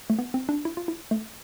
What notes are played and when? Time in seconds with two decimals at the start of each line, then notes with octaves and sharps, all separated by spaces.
0.10 A3
0.19 B3
0.34 C4
0.49 D4
0.65 E4
0.77 F4
0.88 E4
1.11 A3